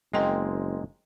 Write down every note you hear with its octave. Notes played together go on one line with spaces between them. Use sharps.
F#1 G#3 A#3 C4 D#5 G5